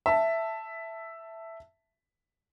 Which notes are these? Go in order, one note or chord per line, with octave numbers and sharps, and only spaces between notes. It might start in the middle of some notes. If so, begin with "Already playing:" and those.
E5 A5